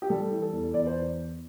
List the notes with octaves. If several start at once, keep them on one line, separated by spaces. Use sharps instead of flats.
G4
G3 A4
E3
A4
E2
E2 D5
C5